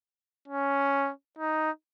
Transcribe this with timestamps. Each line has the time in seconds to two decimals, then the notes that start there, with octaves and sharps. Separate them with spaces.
0.48 C#4
1.39 D#4